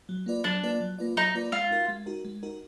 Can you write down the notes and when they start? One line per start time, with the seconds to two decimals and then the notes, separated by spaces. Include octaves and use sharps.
0.09 F#3
0.26 A#3 F4 B4 D5
0.44 F#3 D4
0.63 A#3 F4 B4 D5
0.81 F#3
0.99 A#3 F4 B4 D5
1.16 F#3 D#4
1.35 A#3 F4 B4 D5
1.52 G#3 F4
1.71 D#4 F#4 A#4
1.88 G#3
2.06 D#4 F#4 A#4
2.25 G#3
2.43 D#4 F#4 A#4